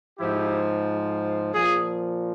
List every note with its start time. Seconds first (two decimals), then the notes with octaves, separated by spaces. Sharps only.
0.19 G#2 F3 E4 G4
1.52 A#2 F3 F4 G#4